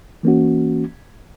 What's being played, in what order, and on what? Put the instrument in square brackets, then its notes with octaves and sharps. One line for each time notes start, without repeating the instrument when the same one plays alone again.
[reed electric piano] E3 A#3 C#4 F#4